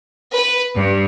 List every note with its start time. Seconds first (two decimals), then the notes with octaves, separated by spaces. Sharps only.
0.34 B4
0.75 G2